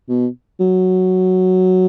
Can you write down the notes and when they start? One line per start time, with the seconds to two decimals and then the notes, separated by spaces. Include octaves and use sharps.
0.09 B2
0.60 F#3